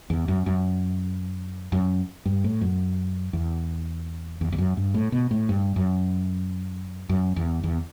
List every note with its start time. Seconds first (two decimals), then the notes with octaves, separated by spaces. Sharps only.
0.10 E2
0.28 F#2
0.46 F#2
1.72 F#2
2.25 G2
2.44 A2
2.61 F#2
3.33 E2
4.41 E2
4.52 E2
4.58 F#2
4.77 G2
4.94 A2
5.12 B2
5.31 A2
5.49 G2
5.76 F#2
7.09 F#2
7.36 E2
7.63 E2